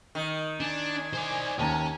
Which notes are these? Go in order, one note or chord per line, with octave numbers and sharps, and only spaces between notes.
D#3
D4 G#5
C5 D5
D#2 C#4 A5 A#5